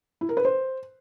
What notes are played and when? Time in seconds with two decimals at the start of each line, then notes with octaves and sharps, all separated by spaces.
0.21 E4
0.29 A#4
0.37 B4
0.45 C5